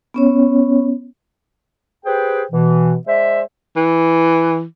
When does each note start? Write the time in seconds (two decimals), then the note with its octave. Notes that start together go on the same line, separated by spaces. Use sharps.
0.14 B3 C#4 C#5
2.05 G4 G#4 B4 C5 G5
2.51 B2 E3
3.07 G#3 C5 D5 E5
3.76 E3